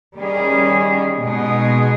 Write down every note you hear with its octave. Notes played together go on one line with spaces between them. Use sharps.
D#3 G3 C#4 G#4
B2 G#3 D#4 G#4